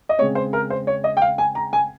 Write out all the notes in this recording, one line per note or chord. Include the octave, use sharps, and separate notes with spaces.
D#5
C#3 G#3 C4 C#5
C5
A#4
C5
C#5
D#5
G5
F5
G#5
A#5
G#5